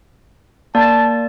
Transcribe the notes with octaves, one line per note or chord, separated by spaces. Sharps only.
A#3 D5 A5